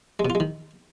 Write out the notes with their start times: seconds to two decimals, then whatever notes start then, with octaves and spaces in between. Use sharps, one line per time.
0.20 G#3
0.25 B2
0.30 F4
0.35 G#3
0.40 D#3